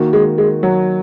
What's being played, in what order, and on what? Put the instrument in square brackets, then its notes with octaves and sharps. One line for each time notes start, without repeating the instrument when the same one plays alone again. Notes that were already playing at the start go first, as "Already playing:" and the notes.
Already playing: [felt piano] D#3 A#3 F#4
[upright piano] G#3
G#3
F#3